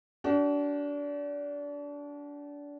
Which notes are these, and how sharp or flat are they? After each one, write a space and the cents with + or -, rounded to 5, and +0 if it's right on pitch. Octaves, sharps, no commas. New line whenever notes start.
D4 -25 F#4 +45